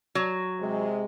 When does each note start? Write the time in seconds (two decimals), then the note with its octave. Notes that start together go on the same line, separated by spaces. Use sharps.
0.15 F#3
0.60 C3 G#3